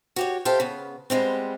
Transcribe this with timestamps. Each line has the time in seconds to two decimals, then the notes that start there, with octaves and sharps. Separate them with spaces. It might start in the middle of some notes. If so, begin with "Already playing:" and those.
0.16 F#4 G4 C#5
0.45 G4 A4 C5 E5 F5 G5
0.60 C#3 B3
1.10 G3 G#3 B3 C4